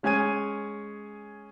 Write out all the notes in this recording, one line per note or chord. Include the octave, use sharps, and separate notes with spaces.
G#3 C#4 G#4 G#5 G#6 D#7